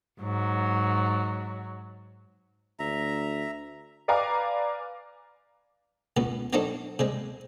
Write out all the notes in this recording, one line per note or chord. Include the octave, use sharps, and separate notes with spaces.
G#2 F#3
D2 E5 A#5
B4 D5 F5 G#5 A#5 D6
C#2 B2 B3
F#3 C4 D4 D#4 F#4 A4
C3 G3 G#3